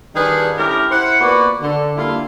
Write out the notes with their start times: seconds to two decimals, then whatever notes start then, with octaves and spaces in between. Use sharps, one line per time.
0.15 D#3 G3 D4 F4 G#4 B4
0.56 A3 C#4 E4 G4 A#4
0.91 E4 C5 F#5
1.21 A#3 B3 F4 F#4 B4 D5
1.61 D3
1.97 D3 G3 A#3 E4 F4